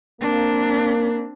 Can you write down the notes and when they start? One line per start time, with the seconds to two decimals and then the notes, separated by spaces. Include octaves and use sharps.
0.21 A#3 C4 D4